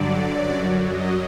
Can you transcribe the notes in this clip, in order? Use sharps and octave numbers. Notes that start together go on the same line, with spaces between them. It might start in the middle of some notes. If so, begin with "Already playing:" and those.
Already playing: G2 D3 F#3 D5
F#2 F#3
D#5